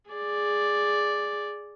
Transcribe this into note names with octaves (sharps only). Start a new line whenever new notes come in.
G#4 D5